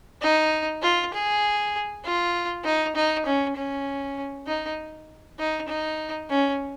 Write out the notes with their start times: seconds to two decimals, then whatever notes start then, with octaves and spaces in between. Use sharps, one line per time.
0.22 D#4
0.82 F4
1.13 G#4
2.04 F4
2.65 D#4
2.96 D#4
3.26 C#4
3.56 C#4
4.47 D#4
5.39 D#4
5.68 D#4
6.30 C#4